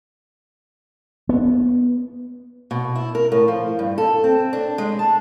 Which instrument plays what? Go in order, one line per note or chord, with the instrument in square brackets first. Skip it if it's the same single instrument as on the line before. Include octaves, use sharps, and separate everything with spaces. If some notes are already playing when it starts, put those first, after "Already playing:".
[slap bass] B3
[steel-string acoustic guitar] B2
E4
A#4
A2
F3
G2
A4
C4
D4
G#3
A5